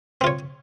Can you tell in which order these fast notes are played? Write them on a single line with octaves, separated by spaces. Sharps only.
C4 F4 C#5